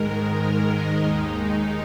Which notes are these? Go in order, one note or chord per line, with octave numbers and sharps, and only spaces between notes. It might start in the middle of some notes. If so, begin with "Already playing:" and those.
Already playing: G#2 D#3 G#3 A#4
D#4
D#2 D#3 G#3 D#4